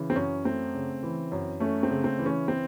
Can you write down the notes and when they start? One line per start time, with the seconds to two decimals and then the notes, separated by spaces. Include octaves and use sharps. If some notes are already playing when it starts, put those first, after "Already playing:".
Already playing: C#3 E3
0.10 C4
0.15 F#2 C#4
0.45 A3 C4
0.74 C#3
1.03 E3
1.32 F#2
1.60 A3 C#4
1.83 C4
1.90 C#3
2.04 C4
2.19 E3
2.26 C#4
2.48 C4